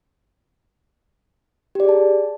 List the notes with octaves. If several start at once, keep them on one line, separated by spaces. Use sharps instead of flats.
G4 G#4 D5 A5